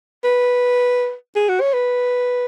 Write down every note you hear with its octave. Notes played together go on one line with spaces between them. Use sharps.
B4
G#4
F#4
C#5
B4